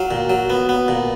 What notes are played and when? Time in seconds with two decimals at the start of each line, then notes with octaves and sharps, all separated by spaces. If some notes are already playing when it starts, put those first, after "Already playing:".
Already playing: F#3 F5
0.11 A#2
0.30 F#3
0.50 B3
0.69 B3
0.88 A#2